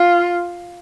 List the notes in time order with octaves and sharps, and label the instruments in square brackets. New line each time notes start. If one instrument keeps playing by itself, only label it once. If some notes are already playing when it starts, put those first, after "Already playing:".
Already playing: [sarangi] F4